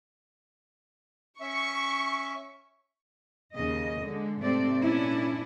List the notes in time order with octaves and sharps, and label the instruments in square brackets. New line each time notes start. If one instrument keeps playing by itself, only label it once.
[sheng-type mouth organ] C#4 E5 [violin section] C#6
[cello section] D#2 C#3 D#5
D3 G#3
G#2 C3 A3 C4 D5
A#2 C#4 D4 E4